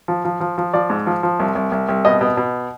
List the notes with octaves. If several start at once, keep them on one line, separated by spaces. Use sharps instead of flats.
F3
F3
F3
F3
F3 D5
G#2
F3
F3
C2
C2
C2
C2
B2 D#5
B2
B2